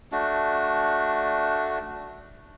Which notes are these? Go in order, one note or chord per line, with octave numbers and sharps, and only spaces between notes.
A3 D4 F#4